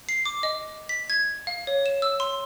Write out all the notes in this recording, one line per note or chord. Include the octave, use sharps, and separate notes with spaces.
C7
D6
D#5
B6
G#6
F5
C#5
E7
E6
C6